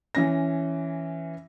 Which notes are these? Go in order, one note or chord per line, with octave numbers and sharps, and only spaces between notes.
E3 C#4 A#6